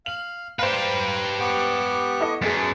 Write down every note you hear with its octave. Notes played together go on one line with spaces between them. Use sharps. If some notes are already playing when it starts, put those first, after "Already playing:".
F5 F#7
G4 B4 C5 F5 A#5
B3 C#6 D6
E4 A4 D#5
G1 F#2 G#4 A5